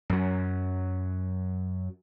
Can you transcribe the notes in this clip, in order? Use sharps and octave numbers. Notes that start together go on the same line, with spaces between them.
F#2 F#3